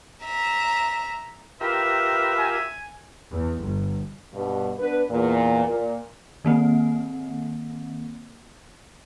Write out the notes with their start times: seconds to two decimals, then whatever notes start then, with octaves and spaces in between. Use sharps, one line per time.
0.25 E5 A#5
1.61 F4 G4 A#4 B4 E5
2.38 G#5
3.30 E2
3.62 G1
4.33 G2 B2
4.78 B3 D4 B4
5.09 E2 A#2
5.64 A#2
6.45 D#3 A#3 C4